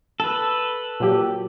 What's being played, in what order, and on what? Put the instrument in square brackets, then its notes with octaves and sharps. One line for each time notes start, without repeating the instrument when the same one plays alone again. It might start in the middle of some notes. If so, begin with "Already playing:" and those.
[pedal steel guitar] A4 B4
[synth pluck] A#2 F#3 G4